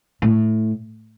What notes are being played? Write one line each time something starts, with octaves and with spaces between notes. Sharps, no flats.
A2